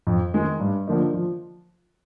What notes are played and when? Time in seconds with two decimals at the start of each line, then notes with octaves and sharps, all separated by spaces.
0.07 F2
0.34 D#3 G#3
0.60 G2
0.87 D3 F3 A#3 D#4
1.14 F3